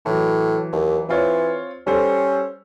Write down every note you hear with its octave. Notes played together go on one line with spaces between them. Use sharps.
A2 E3 F#3
D#2
E3 C4 F4 C#5
G3 C#4 A4 C5